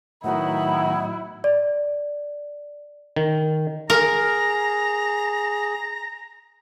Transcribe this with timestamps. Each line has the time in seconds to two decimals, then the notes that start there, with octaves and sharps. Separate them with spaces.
0.24 A2 D#3 F#3 B3 D#4 E4 F#5
1.44 D5
3.16 D#3
3.90 G#4 A#4 A#5